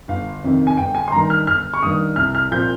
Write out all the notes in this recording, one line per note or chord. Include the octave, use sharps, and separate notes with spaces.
G1 F5
F2 C3 D#3
G#5
G1 G5
G#5
C6
G2 D#3 A#5
F6
G1 F6
C#6
G2 D#3 D#6
C2 F6
F6
A#2 F3 C4 F4 G6